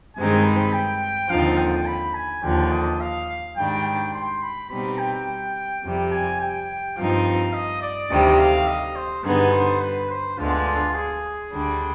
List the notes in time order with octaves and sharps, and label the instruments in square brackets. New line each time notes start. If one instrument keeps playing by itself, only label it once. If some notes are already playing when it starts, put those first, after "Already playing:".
[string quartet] G2 D#3 G#3 C4 D#4 [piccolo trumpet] G#5
[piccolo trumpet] B5
G5
[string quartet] D#2 D3 F3 C4 D#4 [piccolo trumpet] F5
[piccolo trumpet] G5
B5
G#5
[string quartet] D#2 D3 F3 [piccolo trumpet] G5
[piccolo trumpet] D#5
F5
[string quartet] G#2 D#3 G3 D4 [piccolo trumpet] G5
[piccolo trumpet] G5
C6
B5
[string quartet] B2 G3 C4 D#4 [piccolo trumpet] B5
[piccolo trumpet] G5
[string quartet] F2 C3 G3
[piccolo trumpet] G#5
G5
[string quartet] G2 F3 C4 D#4 [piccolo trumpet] F5
[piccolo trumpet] D#5
D5
[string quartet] D2 C3 D#3 G3 [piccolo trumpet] D#5
[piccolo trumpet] F5
D#5
C5
[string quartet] G2 D3 G3 B3 D#4 [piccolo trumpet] G#4
[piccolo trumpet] C5
B4
C5
[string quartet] D2 D3 G#3 B3 [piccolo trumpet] F4
[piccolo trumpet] G#4
[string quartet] D2 D3 G3 D4